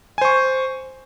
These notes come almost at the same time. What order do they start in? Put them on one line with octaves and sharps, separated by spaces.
G#5 C5 C#6